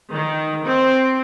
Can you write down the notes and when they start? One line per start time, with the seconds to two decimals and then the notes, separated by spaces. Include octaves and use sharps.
0.12 D#3
0.64 C4